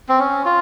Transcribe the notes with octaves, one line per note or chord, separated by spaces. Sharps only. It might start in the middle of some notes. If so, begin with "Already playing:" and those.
C4
C#4
F4